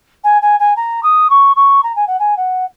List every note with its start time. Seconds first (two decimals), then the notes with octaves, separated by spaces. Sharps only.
0.24 G#5
0.42 G#5
0.59 G#5
0.76 A#5
1.03 D#6
1.30 C#6
1.56 C#6
1.83 A#5
1.96 G#5
2.07 F#5
2.19 G#5
2.37 F#5